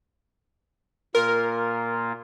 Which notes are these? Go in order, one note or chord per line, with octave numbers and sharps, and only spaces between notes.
A#2 A#3 F4 A#4